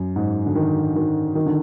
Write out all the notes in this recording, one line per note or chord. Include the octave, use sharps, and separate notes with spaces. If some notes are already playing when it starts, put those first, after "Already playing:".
Already playing: F#2
G#2
D3
D#3
D#3
D#3
D3